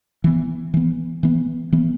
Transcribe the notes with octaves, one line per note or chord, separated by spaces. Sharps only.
E3 B3
E3 B3
E3 B3
E3 B3